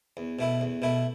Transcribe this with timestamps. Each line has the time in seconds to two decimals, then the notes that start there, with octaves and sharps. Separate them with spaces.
0.17 E2
0.39 B2 A3 E4
0.61 E2
0.82 B2 A3 E4